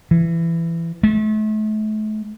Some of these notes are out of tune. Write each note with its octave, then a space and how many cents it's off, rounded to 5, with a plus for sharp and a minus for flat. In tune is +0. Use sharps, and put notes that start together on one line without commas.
E3 +20
A3 -40